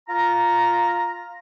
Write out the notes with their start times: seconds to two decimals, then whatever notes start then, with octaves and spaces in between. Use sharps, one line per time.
0.09 F4 A#5